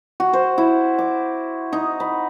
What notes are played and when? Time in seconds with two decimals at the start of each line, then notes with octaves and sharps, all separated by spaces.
0.20 F#4
0.33 C5
0.58 E4
0.98 D6
1.73 D#4
2.00 B5